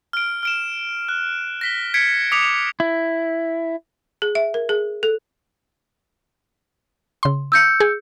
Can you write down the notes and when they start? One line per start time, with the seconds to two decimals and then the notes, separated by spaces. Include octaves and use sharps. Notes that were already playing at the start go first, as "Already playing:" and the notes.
0.13 F6 D7
0.43 F6 D7 E7
1.09 F#6
1.61 A#6 B6 G7
1.94 G#6 B6 C#7 D7
2.32 D6 D#6 B6 C#7 D7 F7
2.80 E4
4.22 G#4
4.35 E5
4.54 A#4
4.69 G#4
5.03 A4
7.23 C#3 C6
7.52 E6 G6 C#7
7.80 G#4